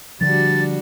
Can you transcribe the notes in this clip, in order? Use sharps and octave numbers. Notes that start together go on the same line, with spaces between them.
D3 F3 G3 D4 F#4 A6